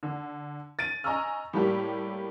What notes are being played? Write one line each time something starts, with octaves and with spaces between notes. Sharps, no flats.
D3
A6 D7 D#7
D#5 G#5 A#5 C#6 E6 F6
A2 G3 A3 A#3 G4